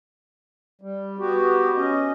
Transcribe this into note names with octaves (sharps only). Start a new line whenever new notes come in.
G3
B3 F#4 G4
C#4 D#5